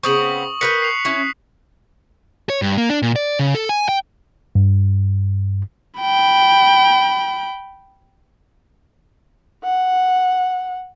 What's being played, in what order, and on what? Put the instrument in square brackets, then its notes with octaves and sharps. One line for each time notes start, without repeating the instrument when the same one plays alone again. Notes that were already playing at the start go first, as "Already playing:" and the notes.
[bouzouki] C#3 B3 C4 [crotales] C#6 D#6 F#7
[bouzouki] A#4 B4 G5 [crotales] F#6 B6 C#7
[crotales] C7 F7
[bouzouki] C#4 E4
[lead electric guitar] C#5
G2
A#3
D4
A#2
D5
C#3
A4
G#5
G5
[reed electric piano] G2
[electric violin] G5 B5
[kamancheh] F#5